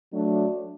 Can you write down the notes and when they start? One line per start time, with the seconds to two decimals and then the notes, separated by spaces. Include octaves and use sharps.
0.13 F#3 A3 D4